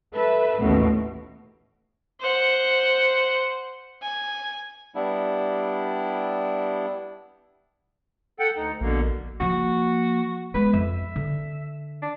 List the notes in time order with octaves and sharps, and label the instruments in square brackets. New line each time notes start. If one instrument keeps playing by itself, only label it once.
[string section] A4 B4 E5
A1 D#2 B2
[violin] C5 F#5
G#5
[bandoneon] G3 B3 D4 E4
[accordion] A4 F#5 G5
D2 D#4
[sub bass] A#1 [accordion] B2 D3 A#3
[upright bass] F3 A#3 [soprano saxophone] F#4
[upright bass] G#3 B3 [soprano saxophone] B4
[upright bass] F2 [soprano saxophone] E5
[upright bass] D3
[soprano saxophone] D4